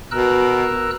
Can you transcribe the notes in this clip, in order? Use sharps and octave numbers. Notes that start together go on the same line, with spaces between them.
B2 A#4 E6 F#6